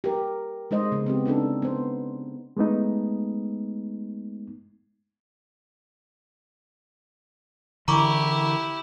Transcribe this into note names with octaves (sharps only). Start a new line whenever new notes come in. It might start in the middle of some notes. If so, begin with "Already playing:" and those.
G4 A#4
G#3 D#4 C5 D#5
C#3 B3
B3 C4 G4
C4 D4 D#4 A4
B3 C5
G#3 A3 B3 D#4
D3 E3 E4 G4 A#5 C#6 D6